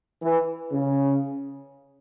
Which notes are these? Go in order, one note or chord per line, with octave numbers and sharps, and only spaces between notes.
E3
C#3